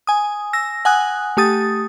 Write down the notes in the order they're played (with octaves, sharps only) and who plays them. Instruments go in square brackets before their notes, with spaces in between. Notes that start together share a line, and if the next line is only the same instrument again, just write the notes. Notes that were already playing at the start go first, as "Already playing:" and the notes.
[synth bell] G#5 D#6
E6 A#6
F#5 G#5 D#6 F#6
A3 G4 D#6 A6